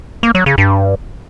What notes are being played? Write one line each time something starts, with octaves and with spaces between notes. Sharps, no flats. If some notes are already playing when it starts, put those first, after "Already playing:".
A#3
F#3
C#3
G2